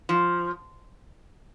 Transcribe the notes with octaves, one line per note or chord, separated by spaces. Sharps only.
F3